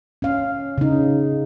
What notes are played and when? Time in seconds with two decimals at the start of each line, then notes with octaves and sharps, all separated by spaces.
0.22 C#4 F5
0.78 C#3 D#4